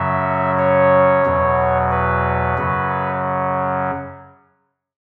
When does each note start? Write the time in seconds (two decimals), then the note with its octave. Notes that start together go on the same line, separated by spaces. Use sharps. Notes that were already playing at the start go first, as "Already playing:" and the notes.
Already playing: F#2 C#3 F#3 E5
0.58 C#5
1.25 E2 B2 F#3
1.91 B4
2.58 F#2 C#3 F#3